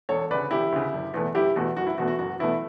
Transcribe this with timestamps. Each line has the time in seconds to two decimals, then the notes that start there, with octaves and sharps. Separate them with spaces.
0.09 E1 A4 C#5
0.30 D2 C#3 B4 D5
0.51 E1 E4 G4
0.72 D2 C#3
0.93 F#1
1.14 E2 B2 A3
1.35 F#1 E4 G4
1.56 E2 B2 A3 F#4
1.77 F#1 F#4
1.87 E4
1.98 E2 B2 A3 F#4
2.08 F#4
2.19 F#1 F#4
2.39 E2 B2 A3 E4